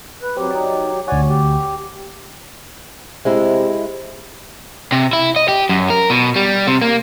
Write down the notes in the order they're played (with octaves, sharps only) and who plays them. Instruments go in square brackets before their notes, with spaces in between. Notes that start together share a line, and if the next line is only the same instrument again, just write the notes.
[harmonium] B4
[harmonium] F#3 G4 [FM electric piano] C4
[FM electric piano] D#4 D5
[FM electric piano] D2 F#4 [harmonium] C#5 D5 G#5
[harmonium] G4
[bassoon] C3 [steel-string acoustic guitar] G#3 E4
[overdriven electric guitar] C3
E4
D#5
G4
F#2
A#4
B2
G3
C3
A#3